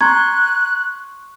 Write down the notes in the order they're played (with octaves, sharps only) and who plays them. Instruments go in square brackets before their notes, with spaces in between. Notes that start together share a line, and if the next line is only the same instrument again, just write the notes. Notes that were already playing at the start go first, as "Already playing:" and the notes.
[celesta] A#5 G#6 [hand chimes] C6 C#6 [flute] F#6